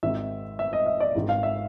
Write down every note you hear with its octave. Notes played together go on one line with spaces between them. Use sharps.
G#1 G#2 D#3 E5
E5
D#5
E5
D5
G#1 G#2 D#3
F5
E5